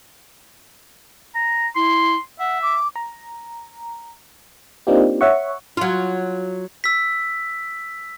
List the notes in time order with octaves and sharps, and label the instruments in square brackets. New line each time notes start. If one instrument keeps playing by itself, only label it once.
[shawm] A#5
[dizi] E4 [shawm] C6
[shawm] E5 [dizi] F#5
[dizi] D6
[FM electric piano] A#5
A#3 C4 D4 D#4 F4 G4
C#5 E5 F#5 C#6
[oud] F#3 F4
[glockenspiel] E6 B6